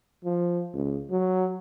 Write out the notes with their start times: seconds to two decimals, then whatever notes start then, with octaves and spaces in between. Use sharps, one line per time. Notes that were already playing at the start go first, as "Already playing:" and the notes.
0.25 F3
0.74 C#2
1.11 F#3